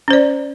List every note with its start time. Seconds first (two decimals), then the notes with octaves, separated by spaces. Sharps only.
0.08 C#4
0.11 C5
0.13 D5